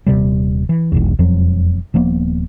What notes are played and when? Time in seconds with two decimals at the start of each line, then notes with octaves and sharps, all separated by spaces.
0.07 D#1 C3 G3
0.69 E3
0.92 E1 B1 E2
1.19 E1 F2 F3 F#3
1.94 D#1 F3 A#3 B3